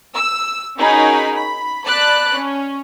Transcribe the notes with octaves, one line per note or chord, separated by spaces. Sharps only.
E6
C#4 D#4 F#4 G#4 A#4 B5
B5
D5 A5 B5 F#6
C#4